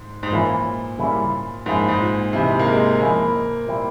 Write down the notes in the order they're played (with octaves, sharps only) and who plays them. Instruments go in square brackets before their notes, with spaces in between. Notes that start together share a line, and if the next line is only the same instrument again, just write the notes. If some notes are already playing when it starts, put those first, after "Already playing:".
Already playing: [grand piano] G#2
G#2
[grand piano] A#2 [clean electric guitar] E3 A#3 C#4 E4
[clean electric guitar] C#3 G3 A#3 C#4 E4
[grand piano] G#2 [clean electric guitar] F3 A#3 C#4 E4
[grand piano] G#2
A#2
[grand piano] C3 [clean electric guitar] E3 G#3 E4
[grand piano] A#3
G#3
[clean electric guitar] F3 G#3 C#4 E4 [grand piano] A#3
[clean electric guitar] A#2 G3 C4 E4